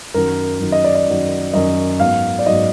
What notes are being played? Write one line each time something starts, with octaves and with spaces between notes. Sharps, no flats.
F#2 D#3 F#3 A#4
F#2 D#3 F#3
D#5
D5
D5
F#2 D#3 F#3
F#2 D#3 F#3 D#5
G#2 F#3 B3 F5
D5
G#2 F#3 B3 D#5